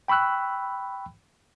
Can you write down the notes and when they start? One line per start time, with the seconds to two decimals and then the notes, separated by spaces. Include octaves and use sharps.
0.08 G5 B5 C#6 E6 F#6